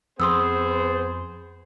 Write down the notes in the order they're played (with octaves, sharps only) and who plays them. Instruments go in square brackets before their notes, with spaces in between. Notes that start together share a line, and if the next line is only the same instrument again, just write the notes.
[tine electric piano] F2 [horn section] B3 G#4 C5 [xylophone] C6 D#6 E6